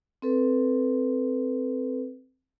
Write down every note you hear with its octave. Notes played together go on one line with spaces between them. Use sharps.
C4 A4 B4